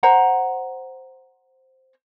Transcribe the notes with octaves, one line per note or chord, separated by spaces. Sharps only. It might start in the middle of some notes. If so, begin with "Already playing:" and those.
C5 F#5 A#5